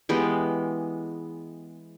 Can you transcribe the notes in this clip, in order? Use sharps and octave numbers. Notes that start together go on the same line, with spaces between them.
E3 G#3 B3 G4